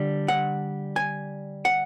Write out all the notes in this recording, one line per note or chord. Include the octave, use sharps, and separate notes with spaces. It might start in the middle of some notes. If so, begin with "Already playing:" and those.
Already playing: D3 G3 D4
F#5
G#5
F#5